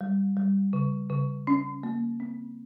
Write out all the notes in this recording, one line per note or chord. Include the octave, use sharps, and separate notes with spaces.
G3
G3
C#3
C#3
C#4
A#3
C4